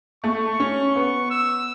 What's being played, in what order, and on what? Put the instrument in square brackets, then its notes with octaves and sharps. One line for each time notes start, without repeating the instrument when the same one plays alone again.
[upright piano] A3 [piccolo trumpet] C#6
[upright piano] C#4
[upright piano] B3 [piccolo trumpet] C#6
[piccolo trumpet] E6